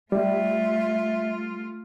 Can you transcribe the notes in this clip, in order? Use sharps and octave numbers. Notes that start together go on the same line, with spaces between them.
G3 A3 F4 E5